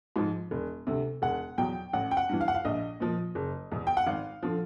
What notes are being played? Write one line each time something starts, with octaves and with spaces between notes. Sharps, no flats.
G#2 F3
E1
D2 C3
E1 F#5
E2 B2 F#3 G5
A1 F#5
G5
F#5
G2 E3
F5
F#5
F5
A#1 D#5
A#2 F3
F#1
E2 B2
G5
F#5
G#1 F5
D3 F3